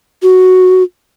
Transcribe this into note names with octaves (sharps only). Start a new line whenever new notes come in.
F#4